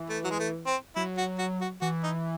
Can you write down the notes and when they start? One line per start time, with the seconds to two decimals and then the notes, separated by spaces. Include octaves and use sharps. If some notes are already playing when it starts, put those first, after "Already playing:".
Already playing: E3
0.09 A3
0.24 F#3
0.31 G#3
0.39 A3
0.67 C4
0.96 F#3 E4
1.18 F#4
1.39 F#4
1.61 F#4
1.81 E3 F#4
2.03 D#4